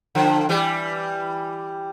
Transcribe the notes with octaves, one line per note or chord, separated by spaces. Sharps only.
D3 F3
E3 G3